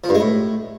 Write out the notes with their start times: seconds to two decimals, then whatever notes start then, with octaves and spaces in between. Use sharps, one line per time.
0.04 F3
0.09 G2
0.15 G#3
0.20 A2